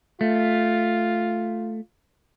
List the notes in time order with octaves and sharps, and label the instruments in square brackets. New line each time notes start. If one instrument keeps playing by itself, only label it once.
[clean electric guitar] A3 [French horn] F4